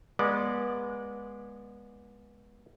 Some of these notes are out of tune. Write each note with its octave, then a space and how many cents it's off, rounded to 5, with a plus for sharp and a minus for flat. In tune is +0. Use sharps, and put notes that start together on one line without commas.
G#3 -10 B3 -30 D5 +0